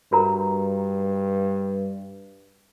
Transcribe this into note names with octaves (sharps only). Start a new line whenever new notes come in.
G2 F#4 A#4 A#5